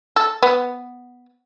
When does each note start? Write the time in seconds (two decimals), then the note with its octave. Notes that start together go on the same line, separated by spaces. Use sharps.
0.16 A4
0.42 B3